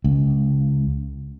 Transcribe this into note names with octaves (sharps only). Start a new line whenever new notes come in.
C#2